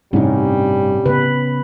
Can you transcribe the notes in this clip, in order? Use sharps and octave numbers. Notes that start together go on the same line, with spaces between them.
A1 G2 C3 G3 C#4 D#4
C#3 B3 B4